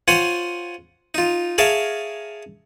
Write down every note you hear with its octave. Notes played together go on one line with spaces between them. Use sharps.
F4 C5 C#5 F#5 G#5
D#4 F4
G#4 A#4 C#5 E5 F5 A5